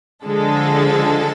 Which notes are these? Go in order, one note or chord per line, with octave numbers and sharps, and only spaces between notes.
D3 F3 G#3 A4